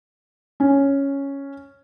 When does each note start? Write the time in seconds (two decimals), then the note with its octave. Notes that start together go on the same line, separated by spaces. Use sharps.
0.60 C#4